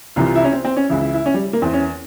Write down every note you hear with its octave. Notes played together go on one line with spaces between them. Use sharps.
C2 C3 E3 F4
F4
E4
C#4
C4
C4
C#4
C#2 C#3 E3 E4
E4
E4
C#4
G3
A#3
E2 E3 C4
C#4